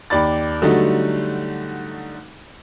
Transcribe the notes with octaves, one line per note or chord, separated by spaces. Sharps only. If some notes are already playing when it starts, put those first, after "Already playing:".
D#2 D5 B5 A6
D3 F#3 G3 A3 D#4 F#4